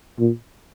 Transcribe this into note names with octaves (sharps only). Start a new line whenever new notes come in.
A#2